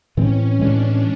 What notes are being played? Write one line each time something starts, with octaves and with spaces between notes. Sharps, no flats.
A2 E3 G#3 C4 C#4
A2 E3 G#3 C4 D4